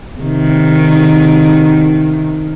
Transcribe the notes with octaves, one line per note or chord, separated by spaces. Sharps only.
C3 D#3